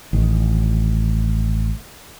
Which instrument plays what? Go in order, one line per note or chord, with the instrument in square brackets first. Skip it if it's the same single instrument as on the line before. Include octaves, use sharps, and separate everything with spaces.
[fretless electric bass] A1 D#3